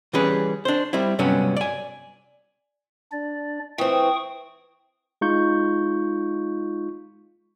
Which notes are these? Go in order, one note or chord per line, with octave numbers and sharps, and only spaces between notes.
E3 G3 C#4 G#4 B4
D4 C5
G3 C4 E4
G2 C3 F#3 G3 B3 C#4
D5 G#5
D4 D5
E3 C4 G5 C#6 D#6
G#3 D#4 F4 C#6 G6